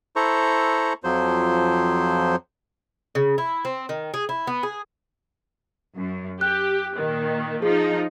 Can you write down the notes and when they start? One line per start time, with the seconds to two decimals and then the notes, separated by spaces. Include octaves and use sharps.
0.16 E4 A4 C5 A#5 C#6
1.04 F2 F3 F#3 C5
3.15 C#3
3.38 E4
3.65 C4
3.89 D#3
4.14 G#4
4.29 E4
4.47 B3
4.63 G#4
5.97 F#2
6.41 G4 F#6
6.97 A#2 D#3
7.62 F3 D#4 G#4